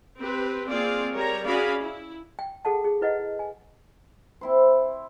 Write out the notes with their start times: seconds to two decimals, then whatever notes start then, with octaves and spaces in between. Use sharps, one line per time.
0.18 C4 G4 B4
0.69 A#3 C4 F4 G#4 D5 F5
1.14 G3 A#4 C#5 A#5
1.45 C#4 F#4 G#4 D5 F5 B5
1.80 E4
2.39 G5
2.65 G#4 A4 F#5 A5
2.84 G#4
3.01 E4 B4 D#5 F#5
3.39 G#5
4.41 C4 E4 C5